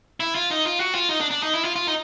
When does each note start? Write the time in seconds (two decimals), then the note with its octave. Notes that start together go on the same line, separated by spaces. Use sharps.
0.20 E4
0.35 F4
0.51 D#4
0.66 F4
0.80 F#4
0.94 F4
1.09 D#4
1.21 D4
1.31 D4
1.43 D#4
1.54 E4
1.64 F4
1.76 F4
1.87 D#4